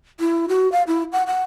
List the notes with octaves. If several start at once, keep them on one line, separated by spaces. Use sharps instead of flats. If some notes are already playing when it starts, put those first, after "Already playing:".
E4
F#4
F5
E4
F#5
F#5